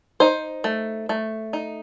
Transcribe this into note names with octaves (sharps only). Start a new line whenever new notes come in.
D#4 C5
A3
A3
D#4